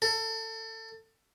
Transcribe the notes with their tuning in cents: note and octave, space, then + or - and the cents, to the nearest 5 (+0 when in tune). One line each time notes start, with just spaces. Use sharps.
A4 +25